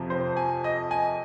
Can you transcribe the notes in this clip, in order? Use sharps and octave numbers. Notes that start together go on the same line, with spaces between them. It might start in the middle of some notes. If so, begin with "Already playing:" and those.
Already playing: F2 C3 F3
C5
G#5
D#5
G#5